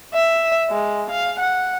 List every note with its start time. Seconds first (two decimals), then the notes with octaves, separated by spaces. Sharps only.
0.14 E5
0.70 G#3
1.10 F5
1.39 F#5